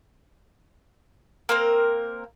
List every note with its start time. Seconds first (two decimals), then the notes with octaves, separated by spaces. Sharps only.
1.49 A#3 C4 A#4